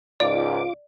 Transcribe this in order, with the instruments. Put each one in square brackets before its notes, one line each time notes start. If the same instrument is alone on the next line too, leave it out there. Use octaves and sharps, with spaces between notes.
[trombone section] C#2 G#2 [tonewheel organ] F4 D6 [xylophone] D5